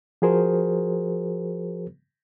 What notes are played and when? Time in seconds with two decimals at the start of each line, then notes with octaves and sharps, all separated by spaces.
0.22 F3 F#4 G#4 A#4 C5